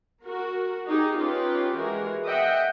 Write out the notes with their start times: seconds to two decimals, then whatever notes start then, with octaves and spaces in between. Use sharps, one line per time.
0.25 F#4 A#4
0.87 D#4 G4 G#4
1.18 C#4 D#4 F4 G4 B4
1.76 E3 G#3 F#4 A#4
2.25 D#5 E5 F#5 G5